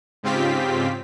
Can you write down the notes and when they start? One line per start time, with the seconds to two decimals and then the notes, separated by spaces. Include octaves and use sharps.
0.23 G#2 C#3 C4 F4 G4 B6